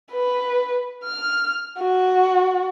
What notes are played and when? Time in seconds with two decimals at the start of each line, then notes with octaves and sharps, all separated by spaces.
0.12 B4
1.04 F6
1.79 F#4